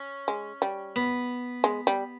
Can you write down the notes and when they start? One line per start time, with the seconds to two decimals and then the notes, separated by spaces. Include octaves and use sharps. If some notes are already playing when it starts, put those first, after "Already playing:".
Already playing: C#4
0.28 G#3
0.62 G3
0.96 B3
1.64 G#3
1.87 G3